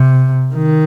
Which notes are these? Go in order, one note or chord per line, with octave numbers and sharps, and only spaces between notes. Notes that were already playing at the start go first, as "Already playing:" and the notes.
Already playing: C3
D#3